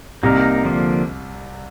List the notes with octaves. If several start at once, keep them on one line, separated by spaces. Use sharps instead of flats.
C2 C3 A#3 D#4 A#4
D3 F3 A#3